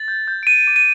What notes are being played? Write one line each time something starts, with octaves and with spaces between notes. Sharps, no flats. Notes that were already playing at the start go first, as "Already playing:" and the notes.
Already playing: A6
G6
G6
D7
G6 D#7
D6
D#7